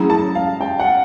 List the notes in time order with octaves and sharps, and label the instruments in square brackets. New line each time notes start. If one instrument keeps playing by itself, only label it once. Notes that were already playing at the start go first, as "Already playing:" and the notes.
Already playing: [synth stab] F#3 A3 C#4 E4 G#4 [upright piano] A#5
[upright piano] A5
F5
G5
F#5